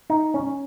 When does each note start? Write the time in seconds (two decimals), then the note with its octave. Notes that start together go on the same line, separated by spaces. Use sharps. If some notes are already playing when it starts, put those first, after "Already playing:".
0.10 D#4
0.34 C#4